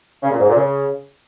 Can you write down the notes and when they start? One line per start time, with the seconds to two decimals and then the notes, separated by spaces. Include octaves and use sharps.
0.23 C#3
0.31 A#2
0.40 G#2
0.49 A#2
0.56 C#3